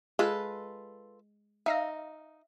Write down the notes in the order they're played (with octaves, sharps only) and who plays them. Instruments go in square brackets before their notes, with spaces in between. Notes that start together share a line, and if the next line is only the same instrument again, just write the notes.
[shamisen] G#3 [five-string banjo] F4 A4 B4
[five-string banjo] D#4 [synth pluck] E5 F5 A#6